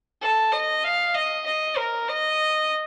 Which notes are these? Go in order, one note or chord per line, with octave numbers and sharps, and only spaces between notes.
A4
D#5
F5
D#5
D#5
A#4
D#5